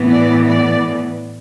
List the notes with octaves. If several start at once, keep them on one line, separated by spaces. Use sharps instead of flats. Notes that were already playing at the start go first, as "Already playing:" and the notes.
Already playing: A2 E3 B3
D5
D5